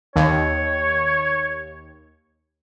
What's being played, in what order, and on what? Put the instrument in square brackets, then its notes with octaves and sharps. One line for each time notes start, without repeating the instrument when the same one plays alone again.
[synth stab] D#2 [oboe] C#5